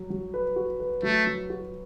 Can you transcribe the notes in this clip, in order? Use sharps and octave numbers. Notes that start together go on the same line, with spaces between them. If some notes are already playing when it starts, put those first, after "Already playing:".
Already playing: F#3 F#4
F#3
B4
F#4
B4
F#3 A3
F#3
F#4